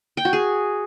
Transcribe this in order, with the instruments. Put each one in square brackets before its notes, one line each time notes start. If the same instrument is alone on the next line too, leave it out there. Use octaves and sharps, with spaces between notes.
[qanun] G5
F#4
G#4